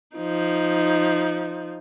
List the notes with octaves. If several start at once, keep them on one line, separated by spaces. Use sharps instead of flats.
F3 D#4